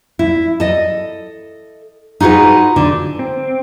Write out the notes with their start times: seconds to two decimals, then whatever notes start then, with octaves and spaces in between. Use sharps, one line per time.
0.19 E4
0.60 A4 D#5
2.20 D#4 F4 F#4 G#4 B4
2.76 D3
3.19 C4